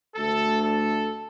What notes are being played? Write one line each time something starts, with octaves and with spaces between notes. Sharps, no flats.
D2 D3 A3 A4
A4